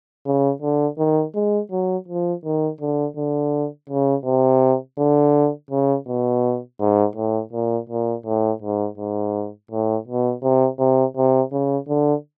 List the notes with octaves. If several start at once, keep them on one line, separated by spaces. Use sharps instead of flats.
C#3
D3
D#3
G#3
F#3
F3
D#3
D3
D3
C#3
C3
D3
C#3
B2
G#2
A2
A#2
A#2
A2
G#2
G#2
A2
B2
C3
C3
C3
C#3
D3